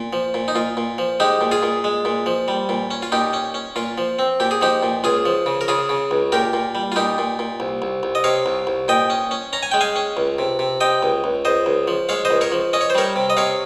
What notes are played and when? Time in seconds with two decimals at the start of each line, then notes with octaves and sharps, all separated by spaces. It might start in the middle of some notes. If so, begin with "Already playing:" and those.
Already playing: A#2
0.13 F3
0.34 A#2
0.48 D#4
0.55 A#2 F4
0.77 A#2
0.98 F3
1.20 G#3 D#4 G4
1.41 A#2
1.51 F4 G#4
1.63 A#2
1.84 G#3
2.05 A#2
2.26 F3
2.48 G3
2.69 A#2
2.91 C#4
3.03 F4
3.12 A#2 D#4 G4
3.33 C#4
3.54 C#4
3.76 A#2 F4
3.98 F3
4.19 C4
4.40 A#2 G4
4.51 G#4
4.61 F3 D#4 G4
4.83 A#2
5.04 C#2 F4 G#4
5.26 F3
5.46 C#3
5.61 A#4
5.68 C#3 F4 G#4
5.89 C#3
6.11 C#2
6.32 A#2 G4 A#4
6.53 A#2
6.75 G3
6.92 F4
6.96 A#2 D#4 G4
7.18 A#2
7.39 A#2
7.60 C2
7.82 C2
8.03 C2
8.15 D#5
8.24 C3 C#5 F5
8.46 C2
8.67 C2
8.88 A#2 D#5 G5
9.10 C#4
9.31 C#4
9.53 C#4 A#5
9.63 G#5
9.71 G#3 G5
9.81 F5 G#5
9.96 C#4
10.17 C#2
10.38 C3
10.59 C3
10.81 C3 D#5 G5
11.03 C#2
11.24 C#2
11.45 C#2 C5 D#5
11.66 C#2
11.88 F3
12.09 G#3 C#5 F5
12.25 C5 D#5
12.31 C#2
12.41 A#4 C#5
12.52 F3
12.73 C#4 D#5
12.81 C#5
12.90 C5
12.95 G3 A#4 C#5
13.16 C3
13.30 D#5
13.37 C3 C#5 F5